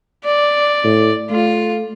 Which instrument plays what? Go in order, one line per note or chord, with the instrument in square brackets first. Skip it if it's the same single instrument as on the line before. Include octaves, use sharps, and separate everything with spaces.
[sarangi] D5
[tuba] A2
[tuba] A3 [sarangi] F4